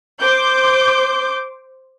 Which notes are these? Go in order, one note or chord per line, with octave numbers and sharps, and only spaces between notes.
C5 D6 G6